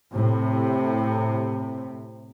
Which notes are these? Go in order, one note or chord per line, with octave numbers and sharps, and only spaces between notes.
A2 C3